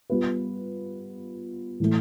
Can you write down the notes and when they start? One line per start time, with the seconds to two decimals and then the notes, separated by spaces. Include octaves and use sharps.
0.10 G3 B3 F4 B4
1.80 A2 E3 A3